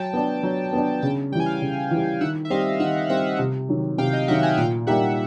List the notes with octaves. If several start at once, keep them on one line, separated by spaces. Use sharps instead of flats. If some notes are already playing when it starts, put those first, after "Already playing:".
Already playing: F#3 G5 A5
B3 D4
F#3
B3 D4
C#3 G5 A5
E3 G3 G5 G#5
F5 G5
C#3
E3 G3
D#3 E5 F#5
E5
G3 C4 D#5 F5
D#3 E5 F#5
G3 C4 E5 F#5
C3
D#3 F#3
C3 F5 G5
D#5 F5
D#3 F#3 E5 F#5
F#5 G#5
A#2 F5 G5
G3 A#3 D#4 G4 E5 F#5